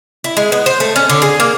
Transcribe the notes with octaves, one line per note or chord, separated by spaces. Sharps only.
E4
G#3
B3
C5
A3
C#4
D3
G#4
A#3